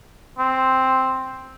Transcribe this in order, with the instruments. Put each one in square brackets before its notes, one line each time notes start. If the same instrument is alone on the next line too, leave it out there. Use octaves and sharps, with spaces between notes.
[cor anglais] C4